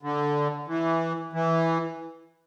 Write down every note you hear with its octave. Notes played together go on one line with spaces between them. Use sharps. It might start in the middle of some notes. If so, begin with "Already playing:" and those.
D3
E3
E3